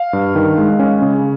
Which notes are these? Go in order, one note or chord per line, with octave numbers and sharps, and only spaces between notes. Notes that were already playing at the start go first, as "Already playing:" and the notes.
Already playing: F5
G2
D#3
G#3
C#4
C#3